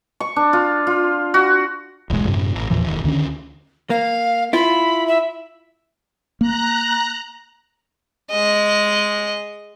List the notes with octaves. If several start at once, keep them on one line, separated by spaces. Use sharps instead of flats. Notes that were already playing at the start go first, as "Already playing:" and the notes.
C#6
D4
F4
F4
F#4
D1 B1 E2 G#3
F#2 A2 C3
A1
E2 A#2 E3 F3
E1 D#2
D2 D3 D#3 C#4
A#3 F5
E4 F4 B5
E5
A#3 A#5 F#6
G#3 D#5